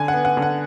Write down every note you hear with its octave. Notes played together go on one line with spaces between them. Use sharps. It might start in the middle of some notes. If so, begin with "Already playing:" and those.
Already playing: D3 G#5
F#5
B3
F#5
D3
F#5